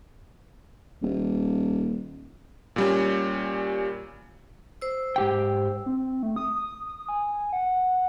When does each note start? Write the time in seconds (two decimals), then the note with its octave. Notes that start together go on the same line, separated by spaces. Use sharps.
1.02 D#1
2.76 A#2 G3 C#4
4.82 C5 E6
5.16 G#2 G4 G5
5.86 C4
6.23 A3
6.36 D#6
6.88 D#6
7.09 G#5
7.53 F#5